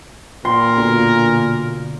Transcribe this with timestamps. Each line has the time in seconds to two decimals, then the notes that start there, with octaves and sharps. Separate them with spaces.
0.45 A#2 A#4 C6
0.77 B2 D3